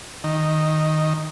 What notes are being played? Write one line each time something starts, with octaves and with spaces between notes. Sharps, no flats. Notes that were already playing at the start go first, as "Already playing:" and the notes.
D#3